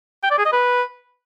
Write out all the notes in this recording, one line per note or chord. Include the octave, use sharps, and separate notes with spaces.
G5
D5
G#4
D#5
B4